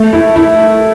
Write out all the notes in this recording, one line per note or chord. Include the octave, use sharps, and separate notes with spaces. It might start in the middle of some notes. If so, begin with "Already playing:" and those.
Already playing: A3
E4
E4